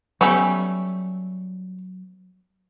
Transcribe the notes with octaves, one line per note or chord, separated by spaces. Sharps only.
F#3 G3 A3 B3 C#4